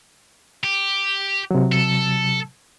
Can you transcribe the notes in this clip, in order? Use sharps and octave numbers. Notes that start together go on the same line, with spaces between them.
G4
C3 F#3
A4